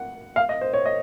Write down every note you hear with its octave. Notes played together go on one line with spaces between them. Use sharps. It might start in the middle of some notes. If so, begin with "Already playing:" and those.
Already playing: F#5
F5
D#5
C5
C#5
D#5